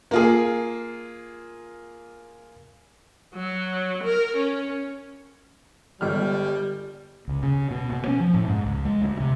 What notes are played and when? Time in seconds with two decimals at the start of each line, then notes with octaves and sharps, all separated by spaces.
0.11 A#3 F4 G#4
3.35 F#3
4.03 A#4
4.36 C#4
6.01 G1 G3 G#3 F6
7.28 C#2
7.43 C#3
7.71 B2
7.92 B2
8.08 C#4
8.20 F3
8.34 A2
8.48 G#2
8.65 C#2
8.85 G#3
9.02 D2
9.20 C3